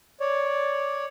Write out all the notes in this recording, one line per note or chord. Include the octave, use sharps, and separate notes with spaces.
C#5 D5